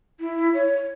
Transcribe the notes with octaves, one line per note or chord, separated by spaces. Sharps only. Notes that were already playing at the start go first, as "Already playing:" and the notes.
E4
C#5